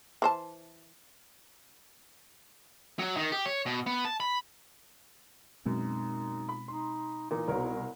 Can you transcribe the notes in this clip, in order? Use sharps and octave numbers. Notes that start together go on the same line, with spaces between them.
E3 C5 A5
F#3
D#3
G4
C#5
B2
B3
A5
B5
F#2 B2 F#3 G#3 C4 D#4
B5
D#4 C6
A#2 E3 A#3 D#4
C2 B2 A#4 B4 C#5